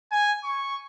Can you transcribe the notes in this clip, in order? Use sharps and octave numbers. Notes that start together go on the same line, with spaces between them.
G#5
C#6